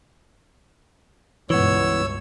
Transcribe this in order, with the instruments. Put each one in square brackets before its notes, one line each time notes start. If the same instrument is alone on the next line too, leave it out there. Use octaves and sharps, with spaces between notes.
[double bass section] C#2 G2 B2 [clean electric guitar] E3 B3 [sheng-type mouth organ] C#5 E6